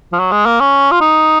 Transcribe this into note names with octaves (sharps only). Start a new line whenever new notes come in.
F3
F#3
G#3
A#3
C#4
F4
D#4